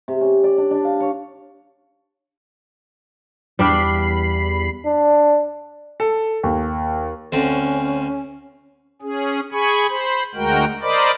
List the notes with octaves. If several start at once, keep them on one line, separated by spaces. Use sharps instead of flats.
C3
C#4
D5
D4
D4
F5
C#5
E2 G3 D4 F5 B5 C7
D4
A4
D#2
D2 C4 C#4
C#4 G#4
G#4 G#5 B5 C#6
C5 B5
D2 G#3 F#4 A#4 G5
A#4 C5 D5 D#5 B5 D6